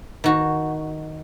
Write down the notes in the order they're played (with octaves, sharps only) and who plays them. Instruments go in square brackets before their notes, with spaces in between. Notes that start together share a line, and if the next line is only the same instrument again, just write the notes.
[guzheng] D#3 F#4